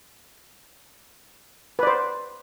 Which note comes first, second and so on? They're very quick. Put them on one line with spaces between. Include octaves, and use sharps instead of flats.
B4 D5 C5